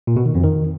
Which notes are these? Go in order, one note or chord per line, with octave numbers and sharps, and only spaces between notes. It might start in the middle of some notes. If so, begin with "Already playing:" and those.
A#2
B2
D#3
F2
D#3